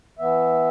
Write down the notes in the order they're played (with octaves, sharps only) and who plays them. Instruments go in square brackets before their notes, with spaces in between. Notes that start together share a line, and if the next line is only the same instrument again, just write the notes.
[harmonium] E3 B3 E5